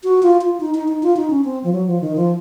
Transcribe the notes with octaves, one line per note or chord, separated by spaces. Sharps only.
F#4
F4
F4
D#4
D#4
D#4
F4
D#4
C#4
C4
F3
F#3
F3
D#3
F3